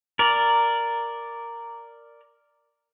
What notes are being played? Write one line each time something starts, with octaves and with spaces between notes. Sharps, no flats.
A#4 D5